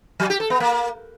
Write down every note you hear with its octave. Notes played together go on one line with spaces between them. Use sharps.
F#3
G4
A4
B3
A#3